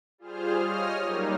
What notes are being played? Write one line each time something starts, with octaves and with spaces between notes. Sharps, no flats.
G3 F4 G#4 C5 F6
C#5 D#5 D#6 F6
F#3 G3 A#3 D#4